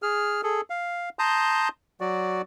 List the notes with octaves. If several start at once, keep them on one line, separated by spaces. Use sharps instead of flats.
G#4 F6
G#4 A4
F5
A5 A#5 C6 D#6 G6
F#3 F#4 D5